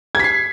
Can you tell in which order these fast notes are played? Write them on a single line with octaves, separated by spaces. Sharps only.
G#6 B6 C7